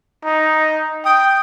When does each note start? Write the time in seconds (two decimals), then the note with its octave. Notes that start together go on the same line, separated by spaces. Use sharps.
0.24 D#4
1.05 G5 D#6